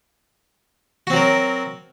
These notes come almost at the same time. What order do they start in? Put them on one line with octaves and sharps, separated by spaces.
F#4 C4 F#3 A#4